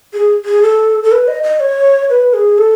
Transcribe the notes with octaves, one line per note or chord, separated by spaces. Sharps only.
G#4
G#4
A4
A4
B4
D#5
D#5
C#5
B4
G#4
A4